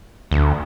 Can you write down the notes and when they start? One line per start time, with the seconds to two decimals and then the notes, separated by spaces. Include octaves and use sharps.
0.31 D2